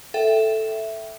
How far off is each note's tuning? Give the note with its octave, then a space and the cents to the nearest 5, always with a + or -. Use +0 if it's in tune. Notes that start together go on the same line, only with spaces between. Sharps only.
A4 +0 E5 +0 G5 -15